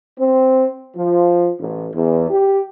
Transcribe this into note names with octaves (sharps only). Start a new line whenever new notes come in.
C4
F3
A1
E2
G4